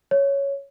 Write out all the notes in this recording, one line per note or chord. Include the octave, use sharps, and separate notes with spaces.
C#5